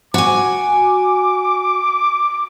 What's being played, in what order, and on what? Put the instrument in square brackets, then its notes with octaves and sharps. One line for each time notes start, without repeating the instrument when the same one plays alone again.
[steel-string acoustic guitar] F#4 G#5 [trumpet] D6